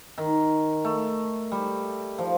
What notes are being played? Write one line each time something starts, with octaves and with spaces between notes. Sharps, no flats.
D#3
A3
G3
F3